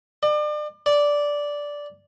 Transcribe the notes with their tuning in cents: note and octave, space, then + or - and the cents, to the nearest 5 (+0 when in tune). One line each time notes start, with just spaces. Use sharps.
D5 +35
D5 -10